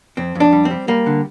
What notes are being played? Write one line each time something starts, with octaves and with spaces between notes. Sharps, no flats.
F2 C4
F2 D4
G3
C4
G3
G3 A#3
D3